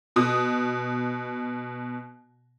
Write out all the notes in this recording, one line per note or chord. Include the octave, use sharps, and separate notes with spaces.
B2 D#6